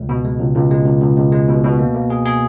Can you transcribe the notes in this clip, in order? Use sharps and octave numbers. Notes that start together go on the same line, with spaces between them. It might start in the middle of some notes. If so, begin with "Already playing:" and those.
Already playing: C#2
B2
G#3
C#2
C#2
G#3
C#2
C#2
C#2
G#3
B2
B2
A#3
A#3
G#4
G#4